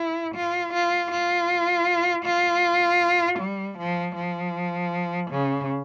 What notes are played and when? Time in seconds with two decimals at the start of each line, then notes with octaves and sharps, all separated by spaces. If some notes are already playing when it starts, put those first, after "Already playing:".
Already playing: E4
0.35 F4
0.73 F4
1.11 F4
2.26 F4
3.40 G3
3.78 F3
4.16 F3
5.31 C#3